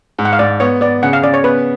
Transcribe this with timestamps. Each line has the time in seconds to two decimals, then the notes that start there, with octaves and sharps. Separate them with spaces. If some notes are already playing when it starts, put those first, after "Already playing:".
0.19 G#2
0.25 F#5
0.33 F5
0.39 G#2 D5
0.60 B3 C#5
0.81 B3 D5
1.03 C#3 F#5
1.13 F5
1.22 C#3 D5
1.34 C#5
1.44 B3 B4